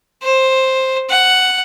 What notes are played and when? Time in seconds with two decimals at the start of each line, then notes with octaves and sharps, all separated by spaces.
0.23 C5
1.10 F#5